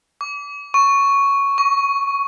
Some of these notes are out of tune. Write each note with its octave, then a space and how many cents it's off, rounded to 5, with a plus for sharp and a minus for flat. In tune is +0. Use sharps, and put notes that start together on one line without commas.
D6 -30
C#6 +5
C#6 +30